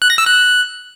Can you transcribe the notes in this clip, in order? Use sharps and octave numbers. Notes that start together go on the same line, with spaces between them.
F#6
A#6
E6
F#6